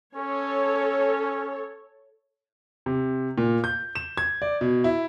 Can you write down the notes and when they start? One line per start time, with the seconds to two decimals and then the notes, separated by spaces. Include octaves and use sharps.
0.15 C#4 A4 C#5
2.86 C3
3.38 A#2
3.64 G6
3.95 E7
4.17 G#6
4.42 D5
4.61 B2
4.84 E4